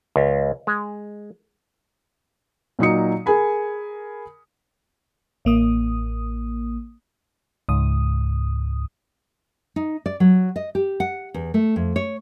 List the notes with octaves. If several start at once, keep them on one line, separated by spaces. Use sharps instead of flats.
C#2
G#3
A#2 F#3 D#4 D#6 C#7
G#4 A#4 G#5 B5
A1 A#3 D#6
C#2 G#2 D#6
D#4
D5
F#3
D#5
G4
F#5
E2
A3
F2
C#5